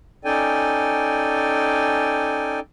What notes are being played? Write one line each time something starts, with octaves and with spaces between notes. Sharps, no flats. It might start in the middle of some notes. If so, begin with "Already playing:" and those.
C#4 D#4 A4 D5 G5 G#5